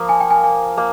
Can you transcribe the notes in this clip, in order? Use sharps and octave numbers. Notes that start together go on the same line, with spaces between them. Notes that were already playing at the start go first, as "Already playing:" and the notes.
Already playing: F3 A#3 A#4
G#5
G5
G#5
G#5
A#3